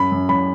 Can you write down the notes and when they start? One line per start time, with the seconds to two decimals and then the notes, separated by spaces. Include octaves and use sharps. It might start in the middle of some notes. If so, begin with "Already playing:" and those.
Already playing: F#2 B5
0.12 F#2
0.29 F#2 B5